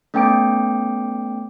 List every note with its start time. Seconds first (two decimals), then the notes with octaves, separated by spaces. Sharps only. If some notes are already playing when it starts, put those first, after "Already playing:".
0.14 A3 B3 C#4 G5 D6 D7